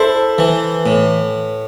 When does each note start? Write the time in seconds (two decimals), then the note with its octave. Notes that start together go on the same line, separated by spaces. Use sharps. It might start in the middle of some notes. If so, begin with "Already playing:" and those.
Already playing: E4 A4 C5
0.38 E3
0.86 A2